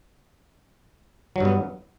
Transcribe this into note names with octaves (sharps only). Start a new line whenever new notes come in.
G2 F#3 B3